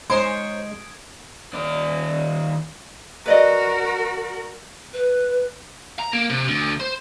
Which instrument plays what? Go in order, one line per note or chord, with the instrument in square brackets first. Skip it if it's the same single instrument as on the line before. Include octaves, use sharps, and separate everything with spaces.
[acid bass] G#3 [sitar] D#4 C5 C#5 [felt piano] C6 [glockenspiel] D#6 G#6 D7
[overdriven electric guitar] D#2 D5
[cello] F#4 A#4 [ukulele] B4 D5 D#5
[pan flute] B4
[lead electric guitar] A#5
A#3
C3
D2
C5